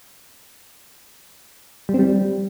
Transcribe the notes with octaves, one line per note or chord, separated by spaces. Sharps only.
G3
C4
G3